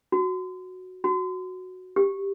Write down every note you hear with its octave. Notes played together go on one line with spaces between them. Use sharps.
F#4
F#4
G4